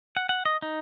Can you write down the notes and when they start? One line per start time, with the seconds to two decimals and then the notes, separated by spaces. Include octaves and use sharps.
0.17 F#5
0.29 F#5
0.45 D#5
0.62 D#4